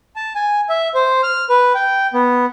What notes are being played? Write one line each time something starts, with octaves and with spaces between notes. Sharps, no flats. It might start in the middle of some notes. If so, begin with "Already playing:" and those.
A5
G#5
E5
C5
F6
B4
G5
B3